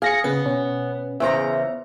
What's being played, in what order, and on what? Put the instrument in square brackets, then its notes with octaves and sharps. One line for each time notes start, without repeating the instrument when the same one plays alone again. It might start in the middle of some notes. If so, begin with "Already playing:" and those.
[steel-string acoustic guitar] G#4 [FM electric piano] F5 A#6 C#7
[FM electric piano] C#3 [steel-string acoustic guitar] B3
[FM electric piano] B2 C#4
[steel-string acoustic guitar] E2 C#3 A#5 [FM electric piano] C5 E5